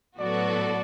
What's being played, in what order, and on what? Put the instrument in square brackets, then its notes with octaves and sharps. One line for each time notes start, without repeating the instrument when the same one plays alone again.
[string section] A2 F#3 B3 F#4 A4 [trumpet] D5